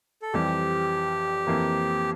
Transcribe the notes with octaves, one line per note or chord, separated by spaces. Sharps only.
A4
F2 E3 G3 G4
F2 E3 A#3